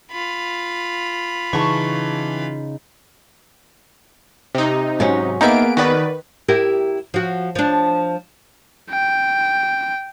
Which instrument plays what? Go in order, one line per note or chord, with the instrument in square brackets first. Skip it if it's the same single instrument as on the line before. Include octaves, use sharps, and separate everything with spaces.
[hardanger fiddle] F4 B5
[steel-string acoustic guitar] C#3 D#4 [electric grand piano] E3 [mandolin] A5 C#6
[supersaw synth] C3 D#4
[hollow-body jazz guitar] G#2 F#3 C#4
[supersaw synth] A#3 D7 [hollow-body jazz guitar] B3 G#4 [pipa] D#4 E5
[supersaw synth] D#3 B4 [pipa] F#4 D5
[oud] E4 G4 A#4
F3 F#4
F3 D4
[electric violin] G5